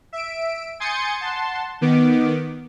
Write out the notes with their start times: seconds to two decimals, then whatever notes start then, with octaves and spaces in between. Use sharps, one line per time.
0.13 E5 D7
0.80 G#5 C6 D#6 G6 A6 C#7
1.21 F#5 A5 C6
1.81 D#3 B3 D6